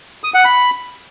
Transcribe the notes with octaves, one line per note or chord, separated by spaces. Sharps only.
D#6
F#5
B5